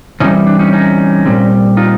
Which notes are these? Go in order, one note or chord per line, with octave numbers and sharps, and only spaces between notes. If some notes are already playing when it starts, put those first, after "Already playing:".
C3 E3 G3 C#4 D#4
D4
C#4 D#4
C#4 D#4
A#2 G3 C4
D#4 F4